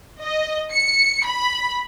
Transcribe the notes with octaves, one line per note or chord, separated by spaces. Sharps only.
D#5
C#7
B5